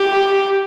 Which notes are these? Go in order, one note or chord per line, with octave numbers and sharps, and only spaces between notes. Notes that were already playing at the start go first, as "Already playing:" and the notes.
Already playing: G4